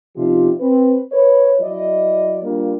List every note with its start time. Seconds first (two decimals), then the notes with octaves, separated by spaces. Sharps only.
0.16 C3 F3 C#4 D#4 F4 G4
0.60 C4 B4
1.12 B4 C#5
1.61 F#3 E4 D5 D#5
2.43 G3 A#3 D4 F4